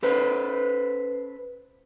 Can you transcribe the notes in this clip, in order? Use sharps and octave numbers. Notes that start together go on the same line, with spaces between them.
C#4 A4 B4 C5